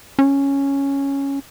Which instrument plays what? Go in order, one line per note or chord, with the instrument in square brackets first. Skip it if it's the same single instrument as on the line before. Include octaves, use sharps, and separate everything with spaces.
[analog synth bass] C#4